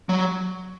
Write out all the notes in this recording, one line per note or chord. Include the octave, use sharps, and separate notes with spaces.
F#3